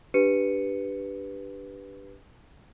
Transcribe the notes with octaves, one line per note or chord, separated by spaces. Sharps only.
D4 G4 B4 C#7 D#7